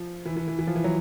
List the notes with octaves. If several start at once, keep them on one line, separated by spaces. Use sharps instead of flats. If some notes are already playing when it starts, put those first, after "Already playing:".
Already playing: F3
E3
E3
E3
E3
F3
E3
F#3